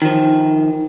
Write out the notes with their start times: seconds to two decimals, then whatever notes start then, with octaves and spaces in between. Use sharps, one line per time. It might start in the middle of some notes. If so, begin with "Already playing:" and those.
0.02 D#3 F3